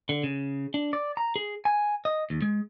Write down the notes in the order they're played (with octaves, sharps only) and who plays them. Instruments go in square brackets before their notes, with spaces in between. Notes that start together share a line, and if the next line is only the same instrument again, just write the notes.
[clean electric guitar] D3
C#3
D4
D5
A#5
G#4
G#5
D#5
D#2
G#3